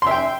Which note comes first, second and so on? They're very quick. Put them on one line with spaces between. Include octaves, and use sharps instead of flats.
C6 E5 G5